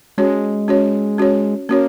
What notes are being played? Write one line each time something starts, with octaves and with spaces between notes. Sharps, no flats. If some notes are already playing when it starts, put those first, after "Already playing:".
G#3 C#4 F#4 C#5
C#4 F#4 C#5
C#4 F#4 C#5
A#3 C#4 F#4 C#5